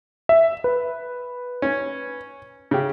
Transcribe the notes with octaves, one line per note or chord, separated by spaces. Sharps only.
E5
B4
C#4
C#3 G4